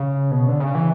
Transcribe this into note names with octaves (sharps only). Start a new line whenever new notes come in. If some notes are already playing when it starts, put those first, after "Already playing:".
Already playing: C#3
B2
D3
C#3
E3